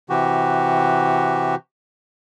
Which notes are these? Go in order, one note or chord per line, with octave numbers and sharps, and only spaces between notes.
C3 E3 F#4 G4